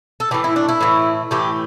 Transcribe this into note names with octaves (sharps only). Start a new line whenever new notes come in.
A4
A2 E3 A3 G4
E4
D4
E4
A2 E3 A3
A2 E3 A3 G4